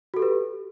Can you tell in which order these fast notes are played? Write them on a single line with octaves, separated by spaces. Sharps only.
F#4 A4 G4 B4